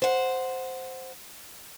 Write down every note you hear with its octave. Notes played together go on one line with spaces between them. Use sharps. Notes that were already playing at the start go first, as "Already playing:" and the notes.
C5 F#5